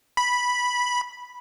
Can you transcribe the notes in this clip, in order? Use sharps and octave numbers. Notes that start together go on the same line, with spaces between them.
B5